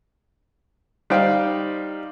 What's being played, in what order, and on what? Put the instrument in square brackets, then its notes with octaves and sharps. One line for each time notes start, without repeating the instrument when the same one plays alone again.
[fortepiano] G3 D#4 C5 F5 G5